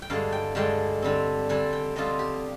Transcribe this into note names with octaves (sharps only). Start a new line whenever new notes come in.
G5
G2 D3 G#3 F5
G5
G2 D3 G#3 G5
D3 G3 C4
D3 G3 C4 G#5
G5
D3 G3 C4 F4 D#5
G4